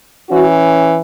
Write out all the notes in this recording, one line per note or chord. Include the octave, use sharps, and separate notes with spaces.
E3 C#4 F#4